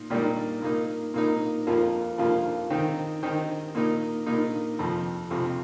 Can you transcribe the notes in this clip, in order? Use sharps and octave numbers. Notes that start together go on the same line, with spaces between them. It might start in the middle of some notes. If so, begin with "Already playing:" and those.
Already playing: A#2 D#4
A#2 G3 A#3 D#4
A#2 A#3 D#4
A#2 A#3 D#4
F2 F3 A#3 F4
F2 F3 A#3 F4
D#3 C4 D#4
D#3 C4 D#4
A#2 A#3 D#4
A#2 A#3 D#4
F2 C3 F3
F2 C3 F3